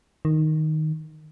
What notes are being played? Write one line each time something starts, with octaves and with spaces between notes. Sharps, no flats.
D#3